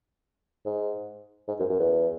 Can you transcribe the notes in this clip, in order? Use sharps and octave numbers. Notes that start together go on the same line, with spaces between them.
G#2
G#2
F#2
F#2
E2